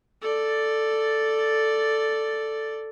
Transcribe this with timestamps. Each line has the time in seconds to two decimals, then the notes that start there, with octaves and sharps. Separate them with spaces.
0.22 A4 D5